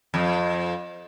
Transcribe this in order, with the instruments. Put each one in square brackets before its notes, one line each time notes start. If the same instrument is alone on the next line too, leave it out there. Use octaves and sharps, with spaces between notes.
[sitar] F2